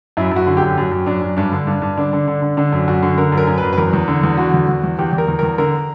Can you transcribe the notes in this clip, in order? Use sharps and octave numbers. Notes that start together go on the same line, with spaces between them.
F#2 E4
F#2
F#4
D3
G4
F#2
F#2
F#2
F#2 D4
F#2
G2 D4
D3
G2
G2
D3 D4
D3
D3
D3
D3 D4
F#2
F#2 F#4
D3
D3 A#4
F#2
A#4
F#2
B4
F#2
B4
E2 A#4
E2
D3
E2
D3 F#4
E2
E2
E2
E2 G4
E2
A#4
E2
E2 A#4
D3 A#4